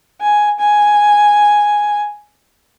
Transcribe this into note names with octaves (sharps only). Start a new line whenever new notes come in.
G#5
G#5